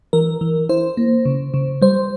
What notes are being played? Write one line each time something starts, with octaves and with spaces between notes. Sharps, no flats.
E3 A#4
E3
E4 C5
A#3
C#3
C#3
G3 C5